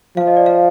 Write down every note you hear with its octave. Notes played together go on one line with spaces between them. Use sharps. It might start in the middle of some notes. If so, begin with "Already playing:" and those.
F3 F5
D#5
D5
F5